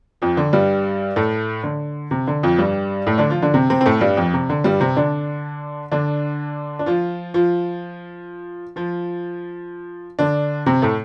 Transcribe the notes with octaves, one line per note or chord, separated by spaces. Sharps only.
F2 F3
D3
G2 G3
A2 A3
D3
C3
D3
F2 F3
G2 G3
A2 A3
D3 D4
F3 F4
D3 D4
C3 C4
C3 C4
C4
A2 A3
G2 G3
F2 F3
C3
D3
G2 G3
C3 C4
D3 D4
D3 D4
D4
F3 F4
F3 F4
F3 F4
D3 D4
C3 C4
A2 A3